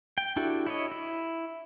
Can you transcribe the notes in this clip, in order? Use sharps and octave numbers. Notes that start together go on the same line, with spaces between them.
G5
D4 E4 F#4 G4 A4
E4 C#5 D#5
E4